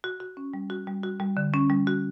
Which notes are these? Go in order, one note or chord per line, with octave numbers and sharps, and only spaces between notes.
F#4
F#4
C#4
G3
F#4
G3
F#4
G3
D3
C#4
G3
F#4